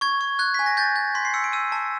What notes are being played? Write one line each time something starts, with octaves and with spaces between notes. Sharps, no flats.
C#6 G#6
C#6
F#6 G#6
G#5 B6
A#6
G6 A6
G6
C6 B6
C7
E6 C#7
D7
E6 D#7
A5